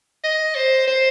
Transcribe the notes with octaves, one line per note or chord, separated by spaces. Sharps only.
D#5
C5
C5